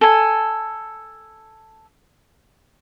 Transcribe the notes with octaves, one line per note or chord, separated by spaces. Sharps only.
A4 G#5